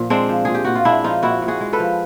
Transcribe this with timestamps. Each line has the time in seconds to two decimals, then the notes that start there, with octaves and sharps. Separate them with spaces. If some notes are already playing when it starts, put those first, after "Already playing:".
Already playing: A#2 F3
0.10 G#3 C4 D4
0.29 F3
0.45 A#2 G#4
0.55 G4
0.65 A#2 F#4
0.75 F4
0.85 G#3 D4 E4
1.04 F3 D#4 F4
1.23 A#2 E4 F#4
1.42 A#2
1.48 F#4 G#4
1.61 G#3
1.73 A4 B4
1.80 F3